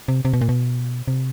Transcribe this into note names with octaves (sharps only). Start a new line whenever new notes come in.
C3
C3
B2
A#2
B2
C3